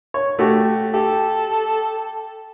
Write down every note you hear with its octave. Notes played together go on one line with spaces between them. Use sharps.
C#5
A3 F#4 G4
G4 A4